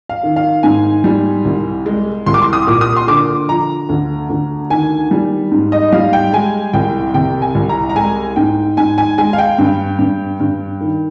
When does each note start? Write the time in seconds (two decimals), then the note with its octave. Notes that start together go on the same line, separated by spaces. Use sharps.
0.09 F5
0.23 D#3
0.36 F5
0.63 G#2 G#5
1.04 G3
1.45 C2
1.86 G#3
2.26 C2 C6
2.34 D6
2.42 C6
2.53 D#6
2.67 A#2 D6
2.81 D#6
2.96 C6
3.07 D3 D6
3.49 F3 A#5
3.89 D2
4.29 D2
4.70 D#3 G#5
5.11 G3
5.52 G#2
5.72 D#5
5.92 G3 F5
6.13 G5
6.33 G#3 G#5
6.73 C2 G5
7.14 C3 G5
7.42 G#5
7.55 C2
7.69 A#5
7.89 A#5
7.96 G#3 G#5
8.36 G#2 G5
8.77 G#2 G#5
8.98 G#5
9.18 G#3 G#5
9.33 F5
9.38 G5
9.58 G2
9.99 G2
10.40 G2
10.80 D#3